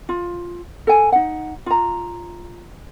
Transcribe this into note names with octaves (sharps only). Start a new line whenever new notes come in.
F4
A4 G#5
D#4 F#5
F4 A#5